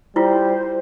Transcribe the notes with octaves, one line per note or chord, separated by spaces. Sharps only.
G3 E4 F4 C5